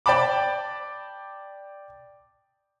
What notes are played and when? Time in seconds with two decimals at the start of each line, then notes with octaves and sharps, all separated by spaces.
0.06 D5 G5 A5 B5 D6